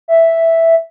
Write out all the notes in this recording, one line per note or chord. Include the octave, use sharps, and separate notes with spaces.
E5